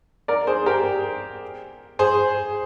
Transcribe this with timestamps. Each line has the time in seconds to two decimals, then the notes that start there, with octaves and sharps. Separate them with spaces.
0.28 A#4 D5
0.47 G#4 C5
0.66 G4 A#4
1.99 G#4 C5